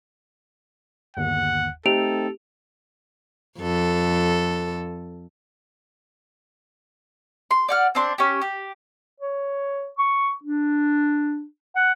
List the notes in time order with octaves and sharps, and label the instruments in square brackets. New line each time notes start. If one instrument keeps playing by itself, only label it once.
[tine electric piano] G1 D#2 [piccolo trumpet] F#5
[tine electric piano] A3 C4 D#4 [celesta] G4 D7 F7 [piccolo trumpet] A4
[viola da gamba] F2 A4
[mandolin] C6
D5 F#5 F6
C4 D4 C6
C#4 G4
G4
[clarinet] C#5
C#6
D4
F#5